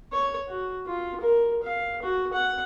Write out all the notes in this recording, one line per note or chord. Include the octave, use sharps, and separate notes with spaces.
C#5
F#4
F4
A#4
F5
F#4
F#5